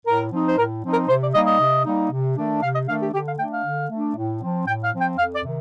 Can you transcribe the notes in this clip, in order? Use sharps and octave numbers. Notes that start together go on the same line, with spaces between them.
A2 A#4
F3 C4 D#4
C5
A2 A#4
F3 C4 D#4
A#4
C3 C5
D5
G3 A#3 D#4 D#5
D#5
C3
G3 A#3 D#4
C3
D#3 A3 D4
C3 F5
D#5
D#3 A3 D4 F5
G4
D3 G4
F5
A3 D4 G5
F5
D3
A3 D4
A2
F3 C4
A2 G5
F5
F3 C4
G5
F2 F5
D5
C3 D#3